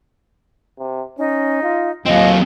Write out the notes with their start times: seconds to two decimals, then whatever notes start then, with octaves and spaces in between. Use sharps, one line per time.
0.79 C3
1.18 C#4 D#4
1.63 F4
2.06 D#2 F#3 C4 F4 D#5